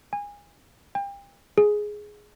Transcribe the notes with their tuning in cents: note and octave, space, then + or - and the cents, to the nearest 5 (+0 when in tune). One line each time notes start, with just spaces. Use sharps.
G#5 -25
G5 +35
G#4 +5